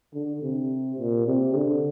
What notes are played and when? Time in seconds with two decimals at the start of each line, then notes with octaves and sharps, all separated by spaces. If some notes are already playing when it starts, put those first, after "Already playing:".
0.14 D3
0.42 C3
0.99 A#2
1.27 C3
1.55 D3